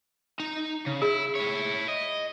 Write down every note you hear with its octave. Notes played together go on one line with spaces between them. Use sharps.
D#4 A#5
C#3
E4 G#4
E4 C#5
D#5